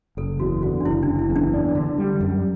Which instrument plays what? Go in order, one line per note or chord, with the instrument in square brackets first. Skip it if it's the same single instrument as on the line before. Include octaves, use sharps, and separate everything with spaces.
[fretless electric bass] F#1 [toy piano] A4
[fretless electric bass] E2 [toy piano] F#4
[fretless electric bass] D3 [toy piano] F#4
[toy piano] D4
[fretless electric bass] F#1 [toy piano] E4
[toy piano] D4
[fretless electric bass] F#1
[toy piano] E4
[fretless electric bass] E2
[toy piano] D4
[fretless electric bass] D4
D3
G3
F#2